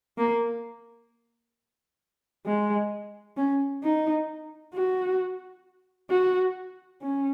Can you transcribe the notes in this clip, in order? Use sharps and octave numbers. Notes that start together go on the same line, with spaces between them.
A#3
G#3
C#4
D#4
F#4
F#4
C#4